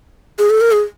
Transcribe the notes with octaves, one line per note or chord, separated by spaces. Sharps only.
G#4
A4
A#4
G#4